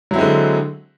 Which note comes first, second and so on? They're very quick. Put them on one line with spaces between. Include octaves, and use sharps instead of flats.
F#3 E4 C4 G#3 D3